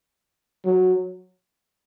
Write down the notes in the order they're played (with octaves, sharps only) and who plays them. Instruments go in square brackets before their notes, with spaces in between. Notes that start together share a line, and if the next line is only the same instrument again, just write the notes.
[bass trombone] F#3